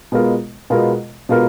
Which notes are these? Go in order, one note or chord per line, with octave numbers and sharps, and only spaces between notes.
B2 G#3 B3 F4 A#4
B2 G#3 B3 F4 A#4
B2 G#3 B3 F4 A#4